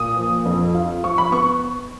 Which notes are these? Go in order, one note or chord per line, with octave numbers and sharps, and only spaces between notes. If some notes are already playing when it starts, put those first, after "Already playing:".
Already playing: A#2 D#6
F3
F2
F4
F3 C#6
B5
B3 C#6